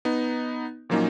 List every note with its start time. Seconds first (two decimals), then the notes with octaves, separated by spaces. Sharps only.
0.05 B3 D#4
0.90 A#2 F3 F#3 A#3 C#4 D#4